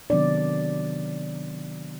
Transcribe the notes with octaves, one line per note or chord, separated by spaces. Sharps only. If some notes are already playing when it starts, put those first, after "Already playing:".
C3 D#3 F#3 B3 D4 D5